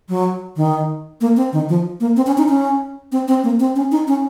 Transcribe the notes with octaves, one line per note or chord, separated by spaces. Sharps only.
F#3
D#3
A#3
C4
D#3
F3
A#3
C4
C#4
D#4
C#4
C4
C4
A#3
C4
C#4
D#4
C#4